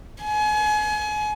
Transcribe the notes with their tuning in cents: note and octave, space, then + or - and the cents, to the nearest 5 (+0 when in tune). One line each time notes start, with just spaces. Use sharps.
G#5 +30